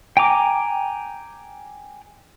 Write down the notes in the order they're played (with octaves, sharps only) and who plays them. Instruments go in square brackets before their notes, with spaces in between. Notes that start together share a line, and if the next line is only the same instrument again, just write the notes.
[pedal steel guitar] G5 G#5 A#5 D6